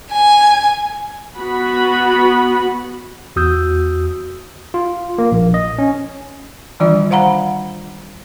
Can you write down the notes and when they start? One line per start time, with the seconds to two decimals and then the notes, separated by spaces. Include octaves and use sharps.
0.11 G#5
1.36 B3 F#4 B5
3.36 E2 F#4 D#6 E6 G6
4.74 F4
5.18 A#3
5.32 A#1
5.54 D#5
5.78 C#4
6.80 D#3 E3 G3 D4 F4 D5
7.10 C5 F5 F#5 A#5 B5